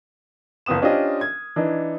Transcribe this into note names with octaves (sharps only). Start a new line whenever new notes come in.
F#1 C#2 B3 D#6 E7
C#4 D4 F4 G4 C5 D#5
G#6
E3 D4 D#4